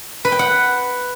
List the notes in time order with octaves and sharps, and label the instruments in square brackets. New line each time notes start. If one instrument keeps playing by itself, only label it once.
[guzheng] B4
G5
F#5